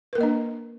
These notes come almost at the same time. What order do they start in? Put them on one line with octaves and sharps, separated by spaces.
B4 A#4 A#3 D#5 D4